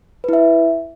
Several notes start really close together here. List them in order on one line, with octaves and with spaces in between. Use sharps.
B4 E4 E5